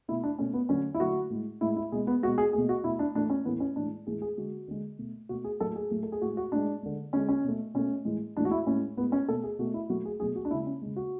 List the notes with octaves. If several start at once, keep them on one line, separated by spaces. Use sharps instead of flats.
B2 A3 E4
D4
B2 A3 C#4
B3
D3 F#3 A3 C#4
E4
D3 F#3 A3 F#4
A2 G#3
A2 G#3 E4
E4
B2 G#3 G#4
B3
B2 G#3 F#4
G#4
B2 A3 G#4
F#4
B2 A3 E4
D4
A2 E3 A3 D4
C#4
A2 E3 A3 B3
C#4
A2 E3 G#3 D4
A2 E3 G#3 G#4
G#4
D3 G#3 F#4
D3 G#3
B2 A3
B2 A3 F#4
G#4
A2 F#3 A3 A4
G#4
A2 F#3 A3
A4
G#4
A2 G#3 F#4
F#4
A2 G#3 D4
D3 G#3
D3 G#3 C#4
C#4
B2 A3
B2 A3 C#4
A2 E3 G#3
A2 E3 G#3 D4
F#4
E4
A2 G#3 C#4
A2 G#3 B3
C#4
B2 A3 A4
G#4
B2 A3 F#4
E4
B2 F#3 A3 F#4
G#4
B2 F#3 A3 G#4
F#4
D4
C#3 G#3 E4
C#4
C#3 G#3
F#4